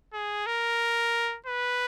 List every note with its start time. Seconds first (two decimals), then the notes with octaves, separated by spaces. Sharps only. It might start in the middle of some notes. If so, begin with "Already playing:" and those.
0.13 G#4
0.46 A#4
1.47 B4